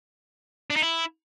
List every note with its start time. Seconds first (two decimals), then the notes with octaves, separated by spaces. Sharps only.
0.70 D4
0.76 D#4
0.82 E4